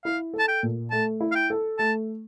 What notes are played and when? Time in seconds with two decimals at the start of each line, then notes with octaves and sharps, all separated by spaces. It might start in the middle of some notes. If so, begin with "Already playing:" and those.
0.05 E4 F5
0.34 A4
0.39 A5
0.48 G5
0.63 A#2
0.91 A3 A5
1.21 E4
1.31 F5
1.35 G5
1.50 A4
1.79 A3 A5